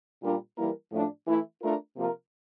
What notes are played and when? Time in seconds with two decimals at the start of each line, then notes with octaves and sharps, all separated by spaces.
0.22 A#2 G3 D4 F4 A#4
0.57 E3 G3 A#3 E4 A#4
0.92 A2 F3 A3 D4
1.27 E3 A3 E4
1.62 A3 D4 F4 A#4
1.97 C3 F3 A#3 F4 A#4